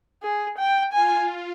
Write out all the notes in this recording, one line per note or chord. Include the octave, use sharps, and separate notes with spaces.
G#4
G5
F4 G#5